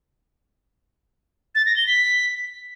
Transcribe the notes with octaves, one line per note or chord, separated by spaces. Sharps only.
A6
A#6
G7
B6